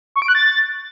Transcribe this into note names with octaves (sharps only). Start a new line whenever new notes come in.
C#6
D7
F#6
A6